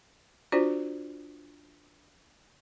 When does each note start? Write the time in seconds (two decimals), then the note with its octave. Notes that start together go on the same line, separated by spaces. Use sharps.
0.52 D4 F4 F#4 C5 D5